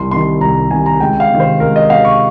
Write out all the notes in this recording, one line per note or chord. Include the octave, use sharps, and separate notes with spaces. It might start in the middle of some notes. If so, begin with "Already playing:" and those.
Already playing: C2 C6
C3 D#3 C6
C2 A#5
C3 D#3 G#5
A#5
C#2 G5
F5
C3 D#3
C5
C#2 A#4
D#5
C3 D#3 F5
C#6